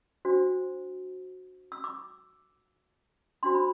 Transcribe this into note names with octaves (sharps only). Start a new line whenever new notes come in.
D4 F#4 C5
E6
D6
D4 F#4 C5 C6
B5